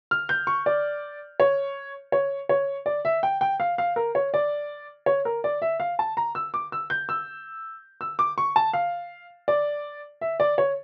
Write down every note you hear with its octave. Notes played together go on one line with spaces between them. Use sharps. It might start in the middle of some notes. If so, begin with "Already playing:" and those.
F6
G6
C#6
D5
C#5
C#5
C#5
D5
E5
G5
G5
F5
F5
A#4
C#5
D5
C#5
A#4
D5
E5
F5
A5
A#5
E6
D6
E6
G6
E6
E6
D6
C#6
A5
F5
D5
E5
D5
C#5